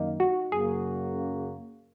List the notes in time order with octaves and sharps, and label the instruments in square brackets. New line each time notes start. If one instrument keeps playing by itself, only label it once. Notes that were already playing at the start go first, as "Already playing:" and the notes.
Already playing: [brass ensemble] F#2 D#3 A#3 [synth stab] D#4
[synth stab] F#4
[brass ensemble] F#2 C#3 A#3 F#4 [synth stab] G#4